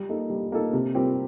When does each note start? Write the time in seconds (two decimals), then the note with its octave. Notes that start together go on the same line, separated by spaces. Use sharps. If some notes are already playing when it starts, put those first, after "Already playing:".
Already playing: G3
0.09 A#3 D#4 A4
0.30 G3
0.52 A#3 D#4 A4
0.73 C3
0.95 G3 C4 G4 A#4